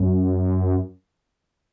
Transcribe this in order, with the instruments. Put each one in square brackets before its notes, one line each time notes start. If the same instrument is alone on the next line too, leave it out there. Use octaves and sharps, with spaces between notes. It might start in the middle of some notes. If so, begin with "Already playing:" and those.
Already playing: [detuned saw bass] F#2